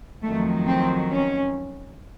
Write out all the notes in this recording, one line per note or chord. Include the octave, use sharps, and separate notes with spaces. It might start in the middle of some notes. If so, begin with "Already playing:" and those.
F2 D#3 F#3 A3
C4
C#4